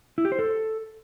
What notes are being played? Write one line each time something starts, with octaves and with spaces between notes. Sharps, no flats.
E4
G4
C5
A4